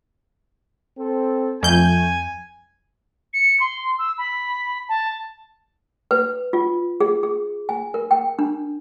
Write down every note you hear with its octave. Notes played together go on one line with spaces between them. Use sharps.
C4 A4
F2 A3 G#5 G6
C#7
C6
E6
B5
A5
B4
F4
G#4
G#4
G#5
A#4
G5
D4